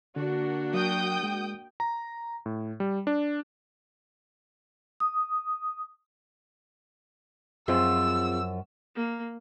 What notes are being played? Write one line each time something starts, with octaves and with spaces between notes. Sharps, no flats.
D3 A#3 D4 F#4
F#3 G5 D#6 G6
G#3
A#5
A2
G3
D4
D#6
F#2 F3 C4 F4 G#4 E6
A#3